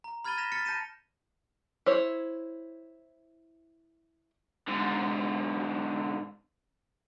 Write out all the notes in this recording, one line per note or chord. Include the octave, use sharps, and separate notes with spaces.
A#5
B5 F6 G#6 A6 D#7 G7
F6 G#6 A#6 B6 E7 F7
F6 A6 B6 C#7
A5 G6 A#6 C#7 D#7 E7
E4 C5 C#5
G#2 D3